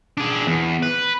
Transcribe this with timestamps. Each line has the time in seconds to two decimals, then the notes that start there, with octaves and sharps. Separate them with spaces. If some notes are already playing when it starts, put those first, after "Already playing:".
0.18 D4 G#4
0.47 E2
0.82 B4